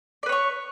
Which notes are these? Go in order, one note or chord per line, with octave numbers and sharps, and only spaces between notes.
B4 C#5 D5 C#6